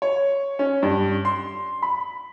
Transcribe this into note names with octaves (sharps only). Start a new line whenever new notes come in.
C#5
C#4
G2
C6
B5